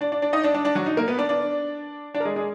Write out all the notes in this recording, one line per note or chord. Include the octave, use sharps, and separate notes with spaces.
D4 D5
D4 D5
D4 D5
D#4 D#5
D4 D5
D4 D5
D4 D5
F#3 F#4
D#4
A#3 A#4
B3 B4
D4 D5
D4 D5
D4 D5
A#4
G#3 G#4
G#3 G#4